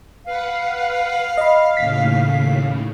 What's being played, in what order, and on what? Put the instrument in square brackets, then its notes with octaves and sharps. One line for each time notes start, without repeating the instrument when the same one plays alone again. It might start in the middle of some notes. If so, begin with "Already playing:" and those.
[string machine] B4 F#5 [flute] F5
[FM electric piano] D#5 B5
[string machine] D#2 A2 C#3 [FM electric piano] B6